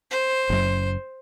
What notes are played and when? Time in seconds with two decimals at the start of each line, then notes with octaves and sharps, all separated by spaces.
0.11 C5
0.50 F#1 F#2